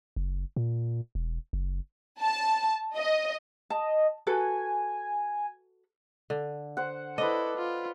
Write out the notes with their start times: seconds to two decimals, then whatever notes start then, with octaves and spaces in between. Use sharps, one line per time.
0.16 F#1
0.56 A#2
1.15 E1
1.53 F#1
2.20 A5
2.94 D#5
3.70 D#5 A5
4.27 F#4 A4 B4 G#5
6.30 D3
6.77 C5 F#5
7.18 E4 A4 B4 C5 D5 D#5
7.56 F4